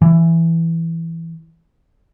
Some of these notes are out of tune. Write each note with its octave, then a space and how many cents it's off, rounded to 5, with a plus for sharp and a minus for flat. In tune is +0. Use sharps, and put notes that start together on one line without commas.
E3 +5